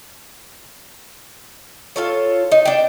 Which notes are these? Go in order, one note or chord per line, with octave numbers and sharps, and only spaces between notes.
F4 A4 C#5
D#4
D4 G5